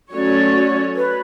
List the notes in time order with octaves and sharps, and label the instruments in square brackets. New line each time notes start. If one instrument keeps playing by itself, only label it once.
[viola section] F#3 A3 C#4 F#4 C#5 [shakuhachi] D5
[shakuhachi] B4